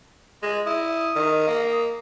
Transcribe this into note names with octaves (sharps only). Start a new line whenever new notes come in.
G#3
E4 D#6
D#3
A#3